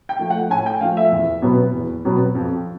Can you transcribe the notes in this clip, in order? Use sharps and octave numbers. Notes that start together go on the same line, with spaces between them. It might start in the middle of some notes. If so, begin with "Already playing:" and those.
G5
F3 A3
F#5
A2 G#5
G5
F3 A3 F5
E5
E2
B2 F#3 B3
E2
B2 F#3 B3
F2